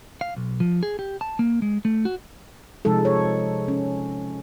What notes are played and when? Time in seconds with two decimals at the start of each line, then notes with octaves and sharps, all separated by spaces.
0.21 F5
0.37 B1
0.60 F3
0.83 G#4
0.99 G4
1.21 A5
1.39 A#3
1.62 G#3
1.85 A3
2.05 F#4
2.85 C3 F3 G#3 D#4 A4
3.05 C#5
3.68 C#4